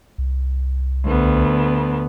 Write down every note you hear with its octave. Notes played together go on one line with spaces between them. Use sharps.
C2
D2 B3